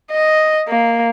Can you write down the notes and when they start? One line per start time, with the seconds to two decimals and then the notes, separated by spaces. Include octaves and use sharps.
0.11 D#5
0.68 A#3